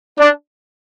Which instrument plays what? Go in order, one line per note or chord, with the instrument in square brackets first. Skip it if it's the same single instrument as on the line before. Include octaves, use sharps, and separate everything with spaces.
[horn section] D4